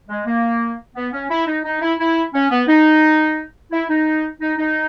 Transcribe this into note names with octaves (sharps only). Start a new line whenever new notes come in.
G#3
A#3
B3
C#4
E4
D#4
D#4
E4
E4
C#4
B3
D#4
E4
D#4
D#4
D#4